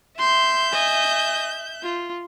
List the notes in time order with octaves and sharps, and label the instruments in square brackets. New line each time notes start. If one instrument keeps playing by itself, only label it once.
[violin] E5 G6 [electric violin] C6
[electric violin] D#5 G#5
F4